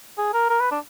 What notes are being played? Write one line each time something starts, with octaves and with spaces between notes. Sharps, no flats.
G#4
A#4
A#4
B4
D4